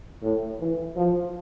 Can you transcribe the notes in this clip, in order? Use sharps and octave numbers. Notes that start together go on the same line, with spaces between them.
A2
E3
F3